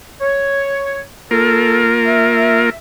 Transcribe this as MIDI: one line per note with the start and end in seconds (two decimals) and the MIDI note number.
0.21 1.00 73
1.31 2.70 58
1.31 2.70 65
1.31 1.85 69
1.31 2.70 70
2.05 2.75 76